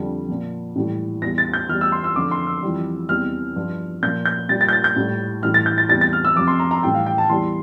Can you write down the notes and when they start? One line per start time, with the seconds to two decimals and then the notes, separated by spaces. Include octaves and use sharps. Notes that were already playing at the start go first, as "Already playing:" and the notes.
Already playing: F2 D3 G3
0.29 A#2 F3
0.76 A2 E3 G3
1.22 E2 E3 G3 A#6
1.38 A6
1.54 G6
1.69 E2 E3 G3 F6
1.81 E6
1.92 C6
2.04 E6
2.16 F2 D3 F3 D6
2.31 C6
2.47 E6
2.62 F2 E3 G3
3.09 E2 C3 E3 G3 F6
3.56 G2 F3
4.03 A#2 F3 G6
4.25 G6
4.49 A#2 G3 A6
4.61 A6
4.69 G6
4.73 A6
4.84 G6
4.96 A2 G3
5.42 A2 E3 G3 F6
5.54 A6
5.66 G6
5.78 A6
5.89 E2 C3 G3 A6
6.01 A6
6.13 F6
6.25 E6
6.36 F2 C3 F3 D6
6.47 C6
6.59 A#5
6.71 A#5
6.83 A2 E3 G3 G5
6.94 F5
7.06 G5
7.18 A5
7.29 E2 E3 G3 C6